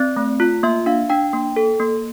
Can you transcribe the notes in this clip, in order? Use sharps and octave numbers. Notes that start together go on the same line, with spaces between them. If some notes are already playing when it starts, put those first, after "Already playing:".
Already playing: C4 D5
A3
F4
A#3 E5
D4 F5
D4 G5
A#3
A4
A#3